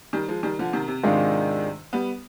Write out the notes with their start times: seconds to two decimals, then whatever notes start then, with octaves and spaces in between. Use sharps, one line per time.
0.13 D#3 G3
0.28 F3 G#3
0.43 D#3 G3
0.59 D3 F3
0.73 C3 D#3
0.88 C3
1.03 G#2 C3 D#3 G#3 D4 F4
1.93 G3 B3